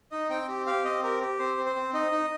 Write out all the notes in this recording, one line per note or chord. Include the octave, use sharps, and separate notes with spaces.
D#4 D#5
C4 G5
G4
G4 F5
C4 D#5
G4 A#4
G4
C4 C5
C4
C5
C4
D#4 D#5
D#4